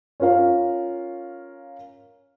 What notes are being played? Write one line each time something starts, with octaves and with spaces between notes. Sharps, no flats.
C#4 F4 A#4 F5